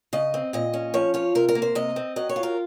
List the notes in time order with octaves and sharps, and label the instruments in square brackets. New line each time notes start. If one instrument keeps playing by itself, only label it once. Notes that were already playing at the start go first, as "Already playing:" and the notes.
[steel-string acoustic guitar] C#3 D#5
C4
A#2 D#5
C#4
F3 C#5
F4 C#5
C3 A#4
A#4
A#3
C5
C3 D#5
C4
F#3 D#5
C#5
F4
A#4